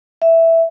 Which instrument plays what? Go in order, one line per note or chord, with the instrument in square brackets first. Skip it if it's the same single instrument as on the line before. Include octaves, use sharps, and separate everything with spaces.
[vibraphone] E5